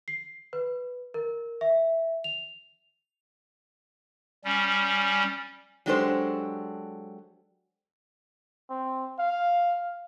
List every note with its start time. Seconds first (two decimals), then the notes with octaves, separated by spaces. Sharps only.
0.08 C7
0.53 B4
1.14 A#4
1.61 E5
2.24 F7
4.45 G3 C#4
5.86 F#3 G#3 D4 G4 A4 C5
8.70 C4
9.19 F5